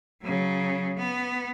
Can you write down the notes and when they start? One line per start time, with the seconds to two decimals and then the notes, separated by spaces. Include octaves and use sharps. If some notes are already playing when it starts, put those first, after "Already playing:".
0.22 C#3 F#3
0.97 B3